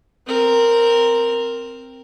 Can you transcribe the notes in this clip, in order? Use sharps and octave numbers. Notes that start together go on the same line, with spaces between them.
C4 A#4